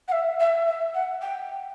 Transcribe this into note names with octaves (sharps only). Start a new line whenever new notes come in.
F#5
E5
E5
E5
F#5
G5